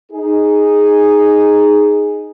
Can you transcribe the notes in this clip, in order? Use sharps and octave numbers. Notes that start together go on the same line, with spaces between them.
D#4 G#4